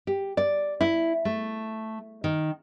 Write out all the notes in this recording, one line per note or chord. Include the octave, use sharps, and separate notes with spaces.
G4
D5
E4
A3
D#3